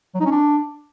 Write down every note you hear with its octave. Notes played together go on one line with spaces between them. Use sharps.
F#3
D#4
C#4
D4